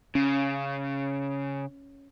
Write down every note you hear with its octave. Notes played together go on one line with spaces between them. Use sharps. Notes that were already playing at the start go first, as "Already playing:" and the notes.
C#3 C#4